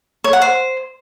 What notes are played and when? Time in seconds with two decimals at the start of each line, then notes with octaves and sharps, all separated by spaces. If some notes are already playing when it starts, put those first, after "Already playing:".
0.24 C#5
0.33 F#5
0.42 C5